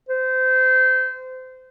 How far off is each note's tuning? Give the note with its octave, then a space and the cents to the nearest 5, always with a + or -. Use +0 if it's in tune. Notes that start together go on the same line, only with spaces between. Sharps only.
C5 -25